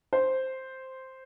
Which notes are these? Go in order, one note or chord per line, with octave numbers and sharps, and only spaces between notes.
C5